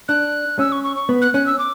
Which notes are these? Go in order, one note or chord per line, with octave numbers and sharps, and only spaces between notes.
D4 F#6
C#4 E6
C#6
C#6
C#6
B3
F#6
C#4 F#6
E6
D6